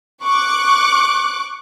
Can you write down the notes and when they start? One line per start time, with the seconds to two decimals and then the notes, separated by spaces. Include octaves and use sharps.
0.22 C#6 D6 F#6